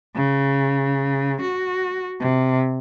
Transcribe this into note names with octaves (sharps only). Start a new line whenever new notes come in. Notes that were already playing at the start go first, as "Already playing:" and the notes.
C#3
F#4
C3